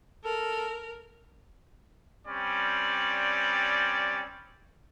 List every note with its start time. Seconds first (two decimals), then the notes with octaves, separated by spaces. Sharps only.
0.25 A4 A#4
2.26 G3 C4 C#4 D5